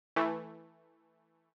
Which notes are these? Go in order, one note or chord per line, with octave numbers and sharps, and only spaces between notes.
E3 A3